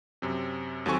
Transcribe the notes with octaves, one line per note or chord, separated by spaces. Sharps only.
F#2 C3
D#2 F#3 C4 A4 G#5 C#6